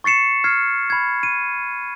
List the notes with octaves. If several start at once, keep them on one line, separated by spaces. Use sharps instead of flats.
C#6 A6 C7 C#7 E7
F6 G#6 C7
B5 G#6
D#7